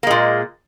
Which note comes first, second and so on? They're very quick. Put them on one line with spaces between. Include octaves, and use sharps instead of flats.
A#3 G#3 A#2